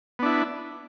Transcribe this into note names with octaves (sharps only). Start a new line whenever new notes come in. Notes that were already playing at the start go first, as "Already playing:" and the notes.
B3 D4 E4